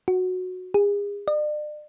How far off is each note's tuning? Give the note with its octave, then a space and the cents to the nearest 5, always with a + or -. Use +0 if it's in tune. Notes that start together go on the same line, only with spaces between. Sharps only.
F#4 -10
G#4 -35
D5 +40